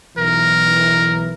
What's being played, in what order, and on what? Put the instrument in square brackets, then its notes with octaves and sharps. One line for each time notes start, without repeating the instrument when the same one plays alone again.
[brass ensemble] B1 E3 [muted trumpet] A#4